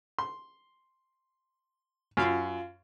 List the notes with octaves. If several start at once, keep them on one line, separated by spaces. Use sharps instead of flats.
C6
F#2 F4 F5